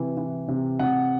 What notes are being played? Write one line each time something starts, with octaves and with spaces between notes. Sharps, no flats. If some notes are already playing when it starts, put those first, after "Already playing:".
Already playing: C3 E3
E3
C3
C3 F#5